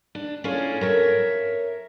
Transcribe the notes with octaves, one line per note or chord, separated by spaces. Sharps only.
D4
C#4 D4 E4 F4 G#4 A4
A#4 C#5 E5